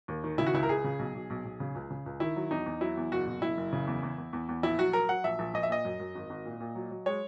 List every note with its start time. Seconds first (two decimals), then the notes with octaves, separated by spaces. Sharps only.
0.08 D#2
0.24 D#3
0.38 C#3 E4
0.46 F#4
0.54 C#2 E4
0.63 A#4
0.69 C#2 G#4
0.84 C#3
0.99 B1
1.15 B1
1.30 B1
1.45 B1
1.60 C#3
1.75 C#2
1.91 C#3
2.06 C#2
2.20 D#3 E4
2.36 F#3
2.51 E2 D#4
2.66 E2
2.81 F#3 E4
2.97 E2
3.12 F#1 F#4
3.27 B2
3.42 F#1 E4
3.57 F#1
3.73 C#3
3.87 E2
4.03 E2
4.18 E2
4.33 E2
4.49 E2
4.63 A#1 E4
4.78 F#3 F#4
4.93 F#3 A#4
5.09 F#3 F#5
5.24 A#1 E5
5.39 A#1
5.54 A#1 D#5
5.63 E5
5.69 A#2 D#5
5.85 F#2
6.00 F#2
6.15 G#1
6.30 G#1
6.45 A#2
6.60 A#2
6.75 F#3
6.91 F#3
7.06 G#3 C#5